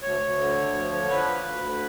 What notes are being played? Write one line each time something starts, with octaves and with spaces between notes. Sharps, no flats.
D2 C#5
D2
D3
D2
F3
D3
F3 B4
D2
D2
D3